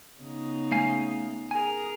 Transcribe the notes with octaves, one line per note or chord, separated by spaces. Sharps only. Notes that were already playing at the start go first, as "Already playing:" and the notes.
C#3 B3 D#4
A3 F5 G#5
G#4 A#4 G#5